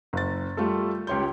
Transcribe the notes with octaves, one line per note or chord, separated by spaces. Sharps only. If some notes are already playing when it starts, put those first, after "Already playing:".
F#1 A6
G3 A3 F4 A4
C#2 G4 C#5 C6 G6